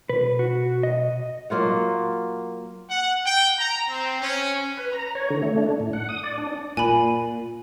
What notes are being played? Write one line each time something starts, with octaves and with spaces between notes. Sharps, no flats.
B2 B4
F#4
D#5
F#3 A#3 F4 F#5
F#5
G5
A#5
C4
C#4
B4
A#5
C#5
D3
A3
D4
A2
F#5
D#6
D5
D4
A#2 G#5 B5